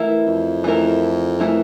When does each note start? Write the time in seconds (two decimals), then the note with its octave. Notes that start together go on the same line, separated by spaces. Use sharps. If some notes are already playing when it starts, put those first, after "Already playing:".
Already playing: E3 A3 E4 A#4
0.26 F2
0.64 E3 A3 E4 A#4
1.39 E3 A3 E4 A#4